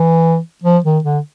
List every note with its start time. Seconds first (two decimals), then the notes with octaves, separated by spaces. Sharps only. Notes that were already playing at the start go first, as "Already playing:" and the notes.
Already playing: E3
0.64 F3
0.84 D#3
1.04 D3